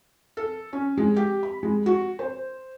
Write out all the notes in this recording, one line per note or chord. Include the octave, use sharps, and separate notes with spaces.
A4
C#4
G#3
G4
B5
G#3
F#4
C5